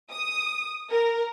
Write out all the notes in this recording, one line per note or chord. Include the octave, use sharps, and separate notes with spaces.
D#6
A#4